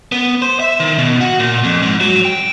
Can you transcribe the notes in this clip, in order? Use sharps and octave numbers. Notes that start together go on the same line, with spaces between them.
B3
C5
E5
D#3
B2
F#4
A#2
F2
G#2
F#3
G5